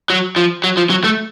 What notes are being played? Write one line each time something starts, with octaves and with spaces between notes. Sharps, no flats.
F#3
F3
F#3
F3
F#3
A3